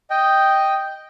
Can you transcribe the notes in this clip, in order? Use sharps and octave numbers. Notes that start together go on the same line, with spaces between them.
D#5 G5